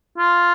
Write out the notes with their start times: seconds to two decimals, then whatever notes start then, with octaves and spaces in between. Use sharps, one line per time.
0.18 F4